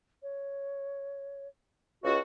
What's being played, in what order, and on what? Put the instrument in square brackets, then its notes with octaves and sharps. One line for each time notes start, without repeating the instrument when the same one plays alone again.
[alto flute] C#5
[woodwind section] C#2 F#4